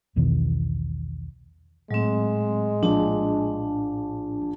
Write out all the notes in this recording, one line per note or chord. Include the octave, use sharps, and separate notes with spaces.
B1 E2 B2 D#3
A2 F#3 G#3 C4
A#1 D4 A5